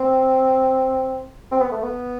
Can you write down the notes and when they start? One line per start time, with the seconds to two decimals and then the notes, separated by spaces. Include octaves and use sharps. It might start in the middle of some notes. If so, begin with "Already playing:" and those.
Already playing: C4
1.51 C4
1.61 B3
1.72 A3
1.83 B3